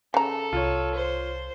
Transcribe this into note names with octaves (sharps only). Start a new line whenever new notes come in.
C#3 A4 A#5
C2 F4 C#5
C5